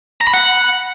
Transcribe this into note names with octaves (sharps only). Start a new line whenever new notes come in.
A#5
B5
F#5